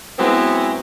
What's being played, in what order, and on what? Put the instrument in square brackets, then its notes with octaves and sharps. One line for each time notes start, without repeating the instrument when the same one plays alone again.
[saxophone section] F#3 G#3 B3 C4 E4 F#4